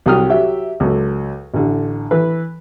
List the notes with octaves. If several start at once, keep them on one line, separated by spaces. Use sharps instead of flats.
C2 F#3 G5 D#6 F6
F#3 G4 E5
C#2 F#3 A4
A1 D3
E3 B4